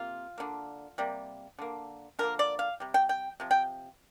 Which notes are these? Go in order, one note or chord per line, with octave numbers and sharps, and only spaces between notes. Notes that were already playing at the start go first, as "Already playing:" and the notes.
Already playing: C3 A#3 F4
D3 A#3
C3 G3 A#3
D3 A#3
D3 F3 A#3 A#4
D5
F5
C3 G3
G5
G5
C3 F3
G5